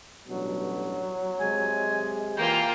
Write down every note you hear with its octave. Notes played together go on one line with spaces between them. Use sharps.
A1 G2 B2 F#3
C3 G#3 G#5
E3 A#3 F4 G5